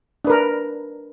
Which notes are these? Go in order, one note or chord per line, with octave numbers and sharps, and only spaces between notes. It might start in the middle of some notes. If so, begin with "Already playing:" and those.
D4 A#4 B4